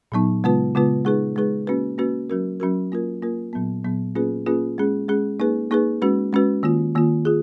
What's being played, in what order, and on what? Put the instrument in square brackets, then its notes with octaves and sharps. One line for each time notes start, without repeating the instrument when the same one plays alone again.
[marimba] A#2 F#3 B3 D#4
C#3 G#3 B3 F4 B4
C#3 G#3 B3 F4 B4
G#3 D#4 G#4 B4
G#3 D#4 G#4 B4
A#3 C#4 F#4 B4
A#3 C#4 F#4 B4
F#3 C#4 F#4 A#4
F#3 C#4 F#4 A#4
A#3 F4 A#4
A#3 F4 A#4
A#2 F#3 B3
A#2 F#3 B3
A#3 C#4 F4 G#4 B4
A#3 C#4 F4 G#4 B4
G#3 C#4 G#4
G#3 C#4 G#4
A#3 D#4 G#4 B4
A#3 D#4 G#4 B4
G#3 C#4 F#4 B4
G#3 C#4 F#4 B4
D#3 A#3 F4
D#3 A#3 F4
F4 G#4